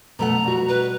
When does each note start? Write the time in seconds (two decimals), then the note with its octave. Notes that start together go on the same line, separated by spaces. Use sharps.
0.19 B2 A3 F#5 A#5
0.44 B2 G3 F#4
0.69 B4